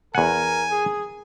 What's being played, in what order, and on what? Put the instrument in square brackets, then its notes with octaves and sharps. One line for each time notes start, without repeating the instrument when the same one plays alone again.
[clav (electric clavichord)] E2 F#5 [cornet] A#4 [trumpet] G#5
[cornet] G#4